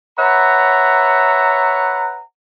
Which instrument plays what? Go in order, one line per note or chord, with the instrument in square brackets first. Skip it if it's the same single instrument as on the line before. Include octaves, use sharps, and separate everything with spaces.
[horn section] B4 C#5 E5 F#5 A#5